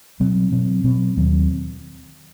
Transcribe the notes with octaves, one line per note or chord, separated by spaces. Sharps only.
B2 F#3 C4
B2 F#3 C4
B2 F#3 C4
D#2 D#3 F#3 C4